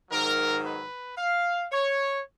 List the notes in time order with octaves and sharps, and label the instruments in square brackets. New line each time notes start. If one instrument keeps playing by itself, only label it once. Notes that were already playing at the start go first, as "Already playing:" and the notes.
[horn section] G#2 D#3 F#3 A#4
B4
F5
C#5